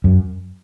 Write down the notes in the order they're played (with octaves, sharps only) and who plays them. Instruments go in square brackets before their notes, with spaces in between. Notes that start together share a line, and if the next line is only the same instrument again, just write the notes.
[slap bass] F#2